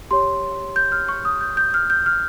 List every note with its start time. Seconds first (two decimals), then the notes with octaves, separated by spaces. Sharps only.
0.11 G4 C#5 C6
0.76 G6
0.92 F6
1.09 C#6
1.25 D#6
1.41 G6
1.57 G6
1.74 F6
1.90 G6
2.06 F6